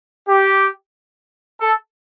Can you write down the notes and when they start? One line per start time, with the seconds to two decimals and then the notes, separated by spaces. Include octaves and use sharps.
0.29 G4
1.60 A4